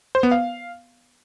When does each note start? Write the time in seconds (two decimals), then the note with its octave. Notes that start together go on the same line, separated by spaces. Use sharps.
0.15 C5
0.23 B3
0.31 F5